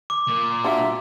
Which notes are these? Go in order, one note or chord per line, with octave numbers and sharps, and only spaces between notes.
D6
A#2
D4 F4 F#4 E5